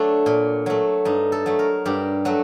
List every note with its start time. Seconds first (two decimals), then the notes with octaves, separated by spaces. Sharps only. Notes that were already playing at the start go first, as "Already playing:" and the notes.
Already playing: F#3 A3 D4
0.26 A#2
0.66 F#3 A3
1.05 G2 D#4
1.32 A4
1.46 F#3 A3
1.59 A#4
1.86 G2 G4
2.25 F#3 A3 F#4